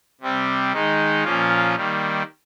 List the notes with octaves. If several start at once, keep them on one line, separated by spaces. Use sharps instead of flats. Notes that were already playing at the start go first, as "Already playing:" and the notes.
C3 G3 C4
D#3 G#3 D#4
A#2 F3 A#3 C#4 F4
D#3 G3 A#3